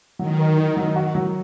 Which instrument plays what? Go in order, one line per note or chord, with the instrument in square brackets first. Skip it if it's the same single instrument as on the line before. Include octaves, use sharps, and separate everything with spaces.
[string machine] D#3 [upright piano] F#3
[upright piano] A#4
D#4
F#3
F#4
F#3